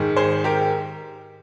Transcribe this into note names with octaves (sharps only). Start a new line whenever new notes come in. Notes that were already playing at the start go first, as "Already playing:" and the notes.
Already playing: G#2 D#3
G#4 C5
G4 A#4